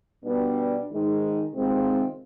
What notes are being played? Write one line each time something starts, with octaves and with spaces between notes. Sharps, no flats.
B2 G3 B3 D4
G#2 D#3 G#3
C3 D#3 G#3 C4 F4